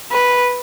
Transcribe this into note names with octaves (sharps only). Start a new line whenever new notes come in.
B4